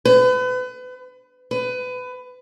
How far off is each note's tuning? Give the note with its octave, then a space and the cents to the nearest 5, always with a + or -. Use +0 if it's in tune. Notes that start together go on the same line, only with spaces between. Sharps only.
B4 +35
B4 +25